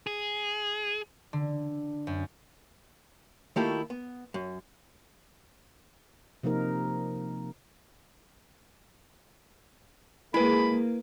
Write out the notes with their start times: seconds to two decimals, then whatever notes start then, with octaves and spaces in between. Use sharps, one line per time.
0.07 G#4
1.33 D3
2.07 F#2
3.56 D#3 A3 A#3 E4 F4 G4
3.90 B3
4.34 F#2
6.43 C3 F3 A#3 D#4 A#4
10.34 G#3 A#3 E4 B4 B5